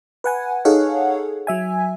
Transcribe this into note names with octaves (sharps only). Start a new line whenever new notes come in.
B4 F#5 G#5
D#4 G#4 A4 C#5 F5 F#5
F#3 E5 G#5